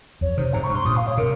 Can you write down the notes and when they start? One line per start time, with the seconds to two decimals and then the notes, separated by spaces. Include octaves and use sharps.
0.21 F2 C#5
0.37 C3 D#3 C5
0.53 G#2 C3 A#5
0.64 C#6
0.69 G2
0.75 C6
0.85 G2 A#2 D#6
0.96 F5
1.07 C#5
1.17 C3 A#4